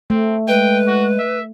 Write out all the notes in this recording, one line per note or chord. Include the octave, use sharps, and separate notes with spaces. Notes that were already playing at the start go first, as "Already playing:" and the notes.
A3 C4
G#3 B4 G5
F#4
E5